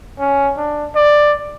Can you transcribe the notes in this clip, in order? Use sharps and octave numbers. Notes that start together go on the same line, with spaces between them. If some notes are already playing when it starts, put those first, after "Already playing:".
C#4
D4
D5